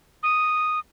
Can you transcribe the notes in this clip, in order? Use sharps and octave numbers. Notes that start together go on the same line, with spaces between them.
D#6